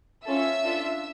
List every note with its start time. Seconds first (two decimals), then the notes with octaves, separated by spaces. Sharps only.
0.25 C#4 F4 A4 E5 E6
0.64 D4 F4 A4